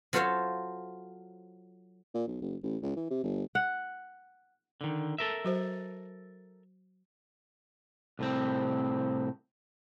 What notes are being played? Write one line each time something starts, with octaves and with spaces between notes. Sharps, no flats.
F#3 F4 A4 C5 C#5 F5
A#2
B1
F#1
A1
C#2
E3
C3
G1
F#5
D3 D#3
A4 A#4 E5
F#3 F#4 C5
C2 A2 C4